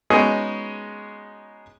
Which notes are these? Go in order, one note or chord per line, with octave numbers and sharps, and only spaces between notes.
G#3 B3 C#4 D#4 F#4 G#4